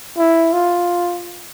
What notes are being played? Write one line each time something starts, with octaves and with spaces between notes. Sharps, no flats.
E4
F4